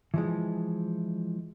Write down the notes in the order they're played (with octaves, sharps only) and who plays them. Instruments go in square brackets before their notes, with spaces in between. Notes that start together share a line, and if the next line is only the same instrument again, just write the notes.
[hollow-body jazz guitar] E3 F3 G#3